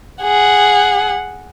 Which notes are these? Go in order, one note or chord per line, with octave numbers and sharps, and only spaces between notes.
G#4 F#5